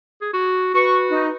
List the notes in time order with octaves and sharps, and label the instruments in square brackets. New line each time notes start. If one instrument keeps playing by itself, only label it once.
[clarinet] G#4
F#4
[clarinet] F#4 [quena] B4 [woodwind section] C#6
[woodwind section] D#4